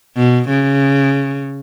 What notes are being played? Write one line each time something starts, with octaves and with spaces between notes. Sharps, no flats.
B2
C#3